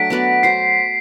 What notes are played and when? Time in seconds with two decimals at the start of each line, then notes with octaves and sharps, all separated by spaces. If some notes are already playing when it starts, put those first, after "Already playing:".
Already playing: F#3 A3 D4 B6 D7
0.10 B3 F#4 B4 D5
0.43 F#4 C5 C7